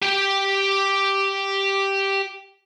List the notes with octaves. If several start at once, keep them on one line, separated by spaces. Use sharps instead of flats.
G4 G5